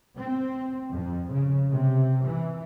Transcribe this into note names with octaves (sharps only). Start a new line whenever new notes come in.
C4
F2
C#3
C3
E3